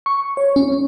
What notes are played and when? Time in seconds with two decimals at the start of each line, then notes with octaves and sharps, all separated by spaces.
0.06 C#6
0.37 C#5
0.56 C#4